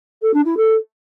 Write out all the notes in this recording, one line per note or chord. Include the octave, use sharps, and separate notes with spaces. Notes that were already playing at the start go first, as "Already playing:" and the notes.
A4
D4
E4
A4